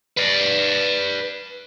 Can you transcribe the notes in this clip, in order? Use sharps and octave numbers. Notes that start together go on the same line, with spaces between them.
B4 D5